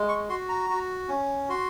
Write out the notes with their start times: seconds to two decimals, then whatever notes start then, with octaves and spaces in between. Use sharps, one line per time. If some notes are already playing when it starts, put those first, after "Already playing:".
Already playing: G#3
0.08 C#6
0.29 F#4 C6
0.49 A#5
0.70 F#4
1.09 C#4
1.49 F#4 C6